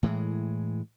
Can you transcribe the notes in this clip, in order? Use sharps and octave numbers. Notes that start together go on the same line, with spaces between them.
A2 E3 G#3